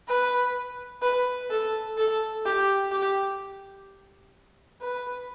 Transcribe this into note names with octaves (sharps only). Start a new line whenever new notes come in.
B4
B4
A4
A4
G4
G4
B4